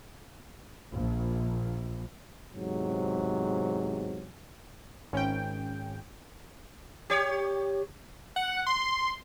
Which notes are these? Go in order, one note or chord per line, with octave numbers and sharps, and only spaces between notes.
A#1
E2 G#2 C3 F#3
G#1 C#4 G5
G4 C#5
F#5
C6